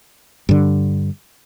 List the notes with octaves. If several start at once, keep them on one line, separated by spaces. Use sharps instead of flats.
G2 D3